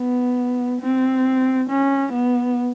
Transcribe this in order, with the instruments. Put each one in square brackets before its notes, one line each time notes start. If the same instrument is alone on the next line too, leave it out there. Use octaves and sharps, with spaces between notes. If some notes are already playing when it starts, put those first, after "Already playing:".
Already playing: [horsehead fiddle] B3
C4
C#4
B3